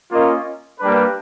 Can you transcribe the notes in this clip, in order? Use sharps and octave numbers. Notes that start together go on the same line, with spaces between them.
A#3 C#4 F4 A#4 D#5
G3 A#3 D4 G4 B4